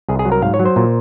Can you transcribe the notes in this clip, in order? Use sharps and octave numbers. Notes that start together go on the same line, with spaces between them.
C2 G#4
G#4
F#3
A#4
G#2 F5
C#5
F#3
C5
A#2